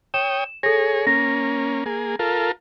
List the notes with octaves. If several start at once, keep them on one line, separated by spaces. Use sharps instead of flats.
C#5 G5 D#6 E7
G#4 A4 C#5 A#6
A#3 C#4 A#6
A#3 G#4
F4 A4 A#4